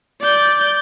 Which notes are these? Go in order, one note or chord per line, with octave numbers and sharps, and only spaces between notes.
D5 G6